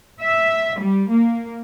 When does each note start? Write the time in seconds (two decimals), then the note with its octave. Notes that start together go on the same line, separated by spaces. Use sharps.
0.21 E5
0.79 G3
1.09 A#3